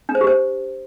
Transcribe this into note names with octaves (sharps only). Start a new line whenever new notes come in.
D4
C5
G4
C5